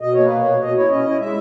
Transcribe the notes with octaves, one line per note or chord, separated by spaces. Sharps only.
B2 D#5
A#3 C#5
B4
B2
C#5
B2
B2 D#5
E4 C#5
C#4 D#5
E4
G#3 E5